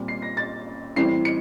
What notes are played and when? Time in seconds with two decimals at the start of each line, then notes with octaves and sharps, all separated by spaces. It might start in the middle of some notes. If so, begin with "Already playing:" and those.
Already playing: A#2 G3 C4
0.08 C7
0.22 A#6
0.37 A6
0.96 A2 E3 G3 C4 C7
1.25 C#7